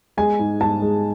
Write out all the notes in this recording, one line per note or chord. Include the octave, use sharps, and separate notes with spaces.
G#3 G#5
G#2
G#2 A5
G#3